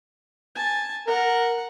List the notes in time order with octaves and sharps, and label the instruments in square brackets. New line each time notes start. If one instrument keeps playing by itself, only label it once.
[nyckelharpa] G#5 A5
[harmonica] A#4 [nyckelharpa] F#5